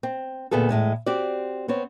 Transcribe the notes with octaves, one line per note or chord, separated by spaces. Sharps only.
C4
D2 A#2 B3 G#4 A4
E2 A2 G#3 A3
C4 F#4 G4 D5
B3 C4 C#5